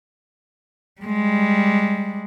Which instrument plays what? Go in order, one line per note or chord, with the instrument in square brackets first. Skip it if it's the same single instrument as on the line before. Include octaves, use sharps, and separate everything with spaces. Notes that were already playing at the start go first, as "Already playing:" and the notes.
[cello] G3 G#3